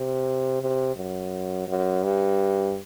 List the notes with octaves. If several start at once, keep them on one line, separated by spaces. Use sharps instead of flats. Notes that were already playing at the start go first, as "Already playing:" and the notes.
Already playing: C3
C3
F#2
F#2
G2